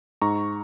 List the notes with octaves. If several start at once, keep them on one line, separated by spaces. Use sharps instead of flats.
G#2 A#5 C#6